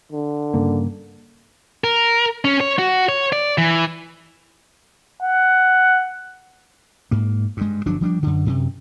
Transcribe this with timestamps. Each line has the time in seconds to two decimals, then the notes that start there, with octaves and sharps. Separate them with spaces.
0.12 D3
0.54 G2 C#3 A#3
1.84 A#4
2.45 C#4
2.60 C#5
2.79 F#4
3.09 C#5
3.32 D5
3.58 E3
5.23 F#5
7.11 G#2 A#3
7.57 G2 G#3
7.86 G1 F3 F#3 D4
8.01 F3 G3 C4 D4
8.23 F#2 D3
8.46 F#2 C3